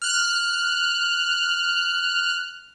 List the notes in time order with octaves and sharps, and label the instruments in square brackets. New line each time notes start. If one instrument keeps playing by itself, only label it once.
[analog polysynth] F6 F#6